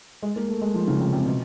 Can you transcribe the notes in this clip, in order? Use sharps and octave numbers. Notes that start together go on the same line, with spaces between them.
G#3
A#3
A3
G#3
F3
C#3
C3
C3
B2